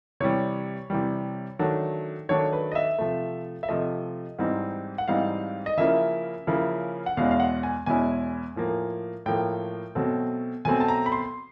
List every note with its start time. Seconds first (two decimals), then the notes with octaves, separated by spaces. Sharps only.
0.20 C3 E3 G3 C#5
0.90 C3 E3 G3
1.59 D#3 F#3 A3 D4
2.29 D#3 F#3 A3 D4 C#5
2.53 B4
2.72 D#5
2.75 E5
2.98 C3 F3 A3
3.63 E5
3.68 C3 F3 A3 D#5
4.39 G#2 E3 G3 C4 D#4
4.98 F#5
5.08 G#2 E3 G3 C4 D#4 F5
5.66 D#5
5.77 C#3 F3 A#3 C#4 E4 E5
6.47 C#3 F3 A#3 C#4 E4
7.06 F#5
7.17 E2 B2 G#3 C#4 E4 F5
7.31 F5
7.40 F#5
7.63 G#5
7.86 E2 B2 G#3 C#4 E4 G#5
8.56 A2 F3 A#3
9.26 A2 F3 A#3 G5
9.95 B2 F#3 A3 C4
10.65 B2 F#3 A3 C4 G#5
10.80 A5
10.88 A#5
11.06 B5
11.12 C6